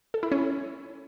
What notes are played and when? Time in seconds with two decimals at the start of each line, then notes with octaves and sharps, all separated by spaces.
0.14 A4
0.23 E4
0.32 C#4